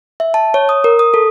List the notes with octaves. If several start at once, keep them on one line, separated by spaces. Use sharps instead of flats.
E5
A5
C#5
D#6
A#4
D#6
A4